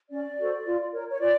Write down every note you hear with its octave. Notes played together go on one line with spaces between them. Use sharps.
C#4 D5
F#4 A4 C5
F4
A#4 C#5
C#5
F4 D5